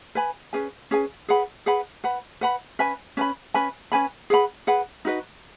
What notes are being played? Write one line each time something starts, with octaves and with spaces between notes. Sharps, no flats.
B4 G#5 B5
C#4 G#4 B4 G#5
C#4 G#4 B4 G#5
G#4 B4 F#5 B5
G#4 B4 F#5 B5
B4 F#5 B5
B4 F#5 B5
C#4 B4 G#5 B5
C#4 B4 G#5 B5
C#4 B4 G#5 B5
C#4 B4 G#5 B5
G#4 B4 F#5 B5
G#4 B4 F#5 B5
D#4 F#4 B4 D#5